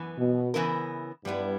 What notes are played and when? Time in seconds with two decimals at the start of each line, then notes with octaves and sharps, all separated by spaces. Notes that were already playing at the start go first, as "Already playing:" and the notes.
Already playing: F#2 E3 B3
0.18 B2
0.54 C#3 E3 B3 E4 A#4
1.25 G2 G3 B3 E4